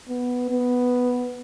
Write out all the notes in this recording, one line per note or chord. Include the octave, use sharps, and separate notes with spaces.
B3
B3